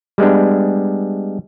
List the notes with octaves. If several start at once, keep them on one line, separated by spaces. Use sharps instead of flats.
G3 G#3 B3 D4